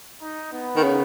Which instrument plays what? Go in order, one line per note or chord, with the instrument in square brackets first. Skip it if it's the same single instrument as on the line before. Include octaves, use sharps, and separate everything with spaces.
[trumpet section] D#4
B3
[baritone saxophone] D#3
C#3